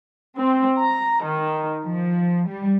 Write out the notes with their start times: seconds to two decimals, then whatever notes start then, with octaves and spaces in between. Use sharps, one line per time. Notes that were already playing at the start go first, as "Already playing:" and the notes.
0.36 C4
0.79 A#5
1.22 D#3
1.84 F3
2.48 G3